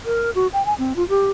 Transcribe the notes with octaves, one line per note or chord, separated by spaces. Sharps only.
A#4
F#4
G5
G#5
C4
F4
G4